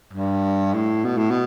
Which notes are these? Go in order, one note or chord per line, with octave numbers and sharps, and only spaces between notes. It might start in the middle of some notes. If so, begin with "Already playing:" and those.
G2
A2
B2
A2
B2